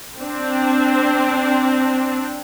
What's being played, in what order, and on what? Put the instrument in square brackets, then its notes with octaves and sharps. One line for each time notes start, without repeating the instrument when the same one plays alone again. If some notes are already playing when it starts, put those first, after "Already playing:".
[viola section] C4 D4